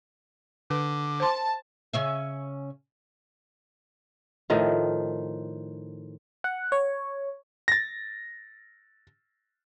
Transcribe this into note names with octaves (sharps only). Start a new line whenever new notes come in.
D3 B4 D6
C5 A5 C6
C#3 C#4 E5
A2 D#3 F3
F#5
C#5
A6 A#6